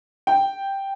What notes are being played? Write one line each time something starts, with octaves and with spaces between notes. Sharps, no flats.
G5